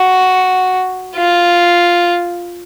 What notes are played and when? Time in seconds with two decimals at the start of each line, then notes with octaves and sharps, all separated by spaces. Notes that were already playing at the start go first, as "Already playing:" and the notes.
Already playing: F#4
1.16 F4